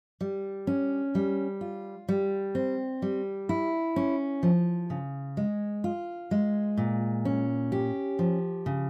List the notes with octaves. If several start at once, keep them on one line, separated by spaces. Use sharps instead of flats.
G3
C#4
G3
F4
G3
C4
G3
E4
C#4
F3
C#3
G#3
F4
G#3
A#2
C#4
G4
F3
C#3